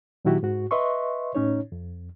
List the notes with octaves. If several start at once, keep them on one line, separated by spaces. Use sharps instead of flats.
A#2 D#3 F#3 E4 F#4 G4
G#2 F#4
B4 D#5 E5 C6 C#6
A2 C#4 D#4 C#5
F2